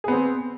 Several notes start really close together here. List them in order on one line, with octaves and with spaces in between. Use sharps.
G#4 B3 C4